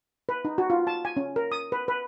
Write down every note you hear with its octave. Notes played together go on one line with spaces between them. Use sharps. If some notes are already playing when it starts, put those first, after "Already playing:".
B4
D#4
F#4
F4
A5
G#5
C#4
A#4
D#6
B4
B4